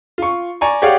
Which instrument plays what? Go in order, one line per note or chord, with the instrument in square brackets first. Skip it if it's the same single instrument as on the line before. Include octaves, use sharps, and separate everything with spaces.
[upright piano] F4 C#6
D5 G#5 A#5 C#6
G4 G#4 C#5 D5 F5 F#5